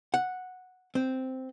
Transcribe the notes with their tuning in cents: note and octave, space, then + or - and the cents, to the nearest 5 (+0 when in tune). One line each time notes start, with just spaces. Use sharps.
F#5 -5
C4 -5